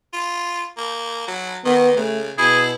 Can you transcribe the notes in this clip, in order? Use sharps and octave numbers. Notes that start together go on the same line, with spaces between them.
F4
A#3
F#3
D#3 B3
C#3 A3
B2 E4 G#4